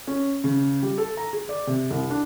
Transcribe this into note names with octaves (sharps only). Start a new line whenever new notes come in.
C#4
C#3
G3
A4
A#5
G#4
D5
C3
C2
D4